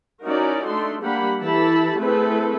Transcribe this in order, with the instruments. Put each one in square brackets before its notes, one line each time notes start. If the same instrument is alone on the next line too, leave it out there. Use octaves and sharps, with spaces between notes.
[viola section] C#4 D#4 E4 F#4 A#4 D5
A3 D4 D#4 A4 C6
G3 A#3 D4 G4 F#5 B5
E3 E4 G4 A4 A5 B5
A3 C4 E4 G#4 A4 B4